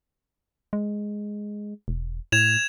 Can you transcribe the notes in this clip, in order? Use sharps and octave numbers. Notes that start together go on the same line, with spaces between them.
G#3
E1
A2 G#6 E7 F7